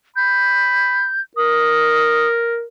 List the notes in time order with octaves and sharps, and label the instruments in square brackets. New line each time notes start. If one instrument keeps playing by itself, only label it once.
[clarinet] B5 [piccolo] G6
[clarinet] A#4 [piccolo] D#6